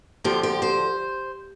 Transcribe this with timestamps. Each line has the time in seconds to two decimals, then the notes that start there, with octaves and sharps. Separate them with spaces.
0.24 D2 D3 F3 G4
0.43 G4
0.62 C5